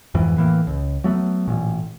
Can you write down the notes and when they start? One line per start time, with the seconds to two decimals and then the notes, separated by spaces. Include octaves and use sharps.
0.15 F2 G#2 E3
0.37 A2 E3 A#3
0.67 C#2
1.04 F#3 A3 B3
1.48 A1 A#2